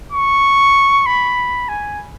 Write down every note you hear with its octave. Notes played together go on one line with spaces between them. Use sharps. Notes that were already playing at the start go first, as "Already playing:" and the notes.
C#6
B5
G#5